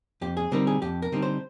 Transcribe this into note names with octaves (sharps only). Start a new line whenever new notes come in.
F2 G4
G#4
D3 G3 C4 D#4 A#4
G#4
F2 G4
A#4
D3 G3 C4 D#4
C5